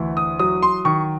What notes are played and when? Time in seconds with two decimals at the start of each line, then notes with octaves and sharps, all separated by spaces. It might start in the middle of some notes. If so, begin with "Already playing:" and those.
Already playing: D2 E3
0.17 D#6
0.39 F#3 D#6
0.62 C6
0.85 D#3 C#6